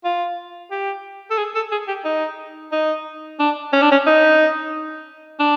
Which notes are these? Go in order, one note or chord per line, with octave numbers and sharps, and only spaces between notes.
F4
G4
A4
G#4
A4
G#4
G4
D#4
D#4
D4
C#4
D4
C#4
D#4
D4